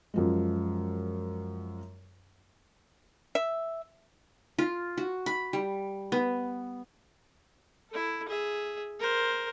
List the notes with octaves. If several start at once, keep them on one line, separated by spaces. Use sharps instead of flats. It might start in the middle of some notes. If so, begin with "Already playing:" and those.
F#2 F3 G#3
E5
F4
F#4
B5
G3
B3
E4 A4
G#4 E5
A#4 C5